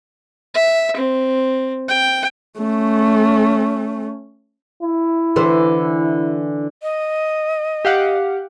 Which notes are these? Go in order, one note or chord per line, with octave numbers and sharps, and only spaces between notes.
E5
C4
G5
A3 C#4
E4
D3 E3 C5
D#5
G4 F5 F#5